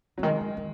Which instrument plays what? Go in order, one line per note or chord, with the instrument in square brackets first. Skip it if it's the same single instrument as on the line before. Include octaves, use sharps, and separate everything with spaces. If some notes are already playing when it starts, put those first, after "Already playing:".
[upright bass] C#3 [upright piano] F#3
[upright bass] D#3 [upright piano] G#3
[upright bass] E3
D#3